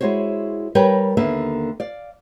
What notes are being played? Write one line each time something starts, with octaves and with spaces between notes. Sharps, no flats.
G#3 E4 F#4 C5 C#5
G3 A#4 B4 C#5 G5
D#2 D3 A#3 B3 E5
D5 F5